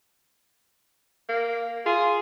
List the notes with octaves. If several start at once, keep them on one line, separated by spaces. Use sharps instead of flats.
A#3
F4 G#4